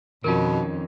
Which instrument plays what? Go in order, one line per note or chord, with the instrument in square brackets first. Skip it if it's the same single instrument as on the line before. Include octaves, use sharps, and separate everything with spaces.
[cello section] F2 [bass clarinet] B2 [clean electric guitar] D#3 C#4 D#4 [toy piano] F4 A#4